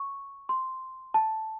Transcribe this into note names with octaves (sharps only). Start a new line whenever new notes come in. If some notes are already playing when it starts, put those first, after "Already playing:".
Already playing: C#6
C6
A5